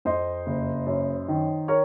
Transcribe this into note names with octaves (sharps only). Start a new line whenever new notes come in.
F2 C5 D#5
F#1
F#2
D#3
A#4 C#5